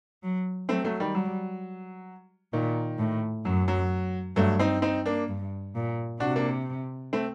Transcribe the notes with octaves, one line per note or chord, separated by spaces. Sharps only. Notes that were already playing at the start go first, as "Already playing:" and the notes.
F#3
F#3 A3 C4
F#3 A3
D#3 G3
F#3 G3
A#2 D#3
A2
F#2 F#3
F#3
G2 F#3 A3
C4 D#4
C4 D#4
A#3 D4
G2
A#2
C3 D4 F#4
A#3 D4
A3 C4